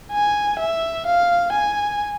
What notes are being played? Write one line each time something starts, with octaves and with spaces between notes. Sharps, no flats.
G#5
E5
F5
G#5